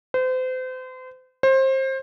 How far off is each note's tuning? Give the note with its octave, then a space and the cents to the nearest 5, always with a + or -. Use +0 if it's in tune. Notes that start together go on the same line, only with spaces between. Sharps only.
C5 -35
C5 +25